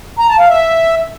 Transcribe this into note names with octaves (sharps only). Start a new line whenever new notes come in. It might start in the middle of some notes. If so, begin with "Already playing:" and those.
A#5
A5
F5
E5